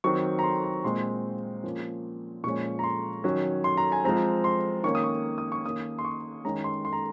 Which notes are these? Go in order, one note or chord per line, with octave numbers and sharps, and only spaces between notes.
D#3 F#3 C4 C#6
A#5
C6
A#5
A#2 G#3 C4 C6
F3 A#3 C#4
A#2 F3 G#3 C#4 C#6
A#5
C6
D#3 F#3 C#4
C6
A#5
G#5
F3 G#3 C4 A#5
C6
D#3 A#3 C#4 C#6
D#6
C#6
D#6
C#6
D#3 A#3 C#4 D#6
C6
C#6
D#3 G#3 C#4 A#5
C6
C6
A#5